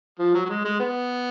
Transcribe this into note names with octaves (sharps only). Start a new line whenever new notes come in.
F3
F#3
F#3
G#3
G#3
B3